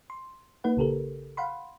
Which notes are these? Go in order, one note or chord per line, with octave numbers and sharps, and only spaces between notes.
C6
A#3 D#4 B4 F#5
A#1 C#3 G4 A4 A#4
F5 F#5 B5 C6